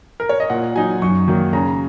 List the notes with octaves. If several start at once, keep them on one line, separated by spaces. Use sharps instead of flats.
A#4
C#5
D#5
A#2 F#5
F#3 D#4 G#5
F#2 C#6
D#3 F#3 A#3
C#3 A#5